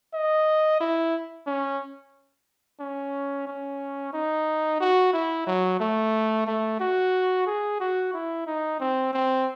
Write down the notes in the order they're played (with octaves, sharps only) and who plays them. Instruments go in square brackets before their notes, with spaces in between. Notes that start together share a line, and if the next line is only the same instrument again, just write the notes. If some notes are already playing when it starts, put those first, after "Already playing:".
[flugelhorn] D#5
E4
C#4
C#4
C#4
D#4
F#4
E4
F#3
A3
A3
F#4
G#4
F#4
E4
D#4
C4
C4